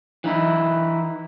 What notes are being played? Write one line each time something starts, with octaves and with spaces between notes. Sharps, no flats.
E3 D#4 E4